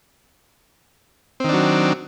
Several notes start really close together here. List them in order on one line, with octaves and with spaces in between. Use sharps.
C4 D#3 D4 F#3